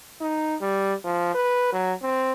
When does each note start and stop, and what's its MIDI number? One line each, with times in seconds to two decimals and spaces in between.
0.21 0.55 63
0.61 0.94 55
1.04 1.30 53
1.34 1.68 71
1.73 1.93 54
2.03 2.33 60